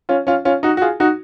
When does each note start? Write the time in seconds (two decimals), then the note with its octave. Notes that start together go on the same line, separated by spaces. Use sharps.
0.09 C#4 F4
0.27 C#4 F4
0.45 C#4 F4
0.63 D#4 F#4
0.77 F#4
0.82 F4 G#4
1.00 D#4 F#4